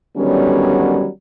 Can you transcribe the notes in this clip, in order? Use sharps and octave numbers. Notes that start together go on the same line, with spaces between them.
D3 D#3 F#3 G3 B3 C#4